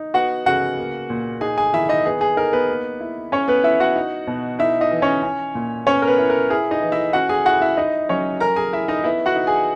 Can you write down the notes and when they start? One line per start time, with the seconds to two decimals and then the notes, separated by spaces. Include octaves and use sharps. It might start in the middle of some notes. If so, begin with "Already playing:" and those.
Already playing: D#4
0.14 B3 F#4 F#5
0.46 C#3 F#4 F#5
0.78 A#3
1.10 A#2
1.41 D#4 G#4 G#5
1.58 G#4 G#5
1.73 D#3 E4 E5
1.89 D#4 D#5
2.05 B3 G#4
2.21 G#4
2.37 D#4 A#4
2.53 B3 B4
2.69 A#3
3.00 E4
3.32 C#4 C#5
3.48 B3 B4
3.64 E4 E5
3.80 F#4 F#5
3.96 D#4
4.27 B2
4.59 D#4 E4 E5
4.81 D#4 D#5
4.91 E3
5.02 C#4 C#5
5.23 C#4
5.55 A#2
5.86 B3 C#4 C#5
6.02 A#4
6.07 B3 B4
6.19 E4
6.30 A#4
6.50 E4 G#4
6.71 D#4 D#5
6.82 E3
6.92 E4 E5
7.13 C#4 F#4 F#5
7.29 G#4 G#5
7.45 E4 F#4 F#5
7.61 E4 E5
7.77 D#4 E4 D#5
8.09 F#3 C#4 C#5
8.40 C#4 A#4 A#5
8.56 G#4 G#5
8.73 E4 E5
8.88 D#4 D#5
9.04 B3 E4 E5
9.26 F#4 F#5
9.36 D#4
9.47 G#4 G#5